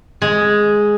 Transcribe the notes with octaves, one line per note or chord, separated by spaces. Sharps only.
G#3